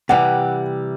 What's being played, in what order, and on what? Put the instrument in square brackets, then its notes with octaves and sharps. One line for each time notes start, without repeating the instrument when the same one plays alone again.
[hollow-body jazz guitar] C3 E3 G3 [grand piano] F#5